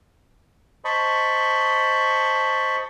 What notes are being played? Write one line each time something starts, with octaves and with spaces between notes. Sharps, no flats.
C5 D#5 A5 B5 C#6